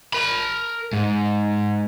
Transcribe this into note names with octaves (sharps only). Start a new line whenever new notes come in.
A#4 B5
G#2